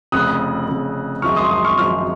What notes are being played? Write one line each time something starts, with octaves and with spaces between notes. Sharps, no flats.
F1 F2 C#3 D#6 F#6
F1 F2 C#3
G#1 F#2 F3 G#3 C#6 F6
C6 D#6
C6 D#6
C#6 F6
G#1 F#2 F3 G#3 C#6 F6